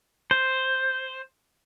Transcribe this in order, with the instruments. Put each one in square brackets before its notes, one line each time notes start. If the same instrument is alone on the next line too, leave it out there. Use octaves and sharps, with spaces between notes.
[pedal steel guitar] C5